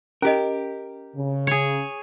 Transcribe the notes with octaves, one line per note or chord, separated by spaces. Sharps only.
C#4 G4 A#4 D#5
C#3
G#4 C#5